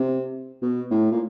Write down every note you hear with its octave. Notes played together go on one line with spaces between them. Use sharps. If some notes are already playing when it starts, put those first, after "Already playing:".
Already playing: C3
B2
A2
A#2